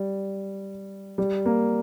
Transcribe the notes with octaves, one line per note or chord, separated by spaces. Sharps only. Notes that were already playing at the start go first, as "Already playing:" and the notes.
Already playing: G3
G3
A#3